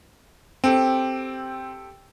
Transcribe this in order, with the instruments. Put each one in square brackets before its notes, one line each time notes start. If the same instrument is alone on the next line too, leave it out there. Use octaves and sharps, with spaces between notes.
[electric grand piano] C4 [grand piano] G4 A4 G5